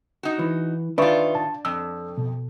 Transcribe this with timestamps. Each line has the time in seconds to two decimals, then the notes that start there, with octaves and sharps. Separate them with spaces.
0.23 D#4 F#4
0.39 E3
0.98 D#3 D4 F4 B4 E5 C#6
1.35 A5
1.65 F2 E6
2.18 B2